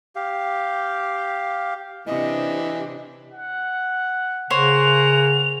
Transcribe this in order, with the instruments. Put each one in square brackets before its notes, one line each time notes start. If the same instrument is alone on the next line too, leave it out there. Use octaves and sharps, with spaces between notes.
[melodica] G4 F5
[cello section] C3 D4 [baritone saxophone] E3 [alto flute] D#5
[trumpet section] F#5
[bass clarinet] C#3 [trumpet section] A#3 F#5 [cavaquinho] C5 C#5 [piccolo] F7